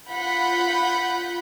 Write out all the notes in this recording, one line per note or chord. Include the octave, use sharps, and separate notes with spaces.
F4 F#5 B5 G6